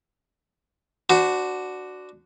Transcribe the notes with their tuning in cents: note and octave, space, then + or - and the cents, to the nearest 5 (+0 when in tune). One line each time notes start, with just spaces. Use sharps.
D4 +0 F#4 +0 C5 -40